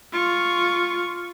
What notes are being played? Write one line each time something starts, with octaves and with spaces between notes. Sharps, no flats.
F4 C#6